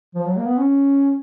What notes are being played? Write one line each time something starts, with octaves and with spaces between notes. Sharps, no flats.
F3
F#3
A#3
B3
C#4